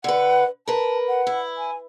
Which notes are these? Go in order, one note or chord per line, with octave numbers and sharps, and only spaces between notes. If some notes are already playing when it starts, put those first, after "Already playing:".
D3 B4 F#5
A#4 B4 A5
F#5
E4
G#5